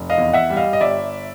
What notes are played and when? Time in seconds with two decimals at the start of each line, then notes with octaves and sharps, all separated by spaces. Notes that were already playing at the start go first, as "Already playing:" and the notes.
Already playing: F1
0.10 D#5 F5
0.18 E2
0.33 E5 F#5
0.50 G3
0.57 D#5 F5
0.73 D#5
0.80 G1 D5 E5